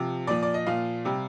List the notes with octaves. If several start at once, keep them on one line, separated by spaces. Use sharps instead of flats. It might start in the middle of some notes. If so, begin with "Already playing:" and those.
Already playing: C3 F3
A#2 F3 D5
D5
D#5
A#2 F3 F5
C3 G3